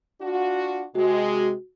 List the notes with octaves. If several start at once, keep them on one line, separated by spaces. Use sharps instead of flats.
D4 F4 F#4
C3 G#3 F#4